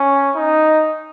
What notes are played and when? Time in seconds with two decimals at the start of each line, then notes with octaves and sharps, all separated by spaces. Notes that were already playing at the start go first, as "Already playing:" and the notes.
Already playing: C#4
0.35 D#4